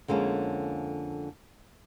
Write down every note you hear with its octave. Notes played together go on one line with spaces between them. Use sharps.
F2 D3 G#3 A#3 C#4